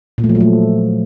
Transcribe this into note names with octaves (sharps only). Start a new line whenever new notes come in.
A#2
A3
F3
F#3
A3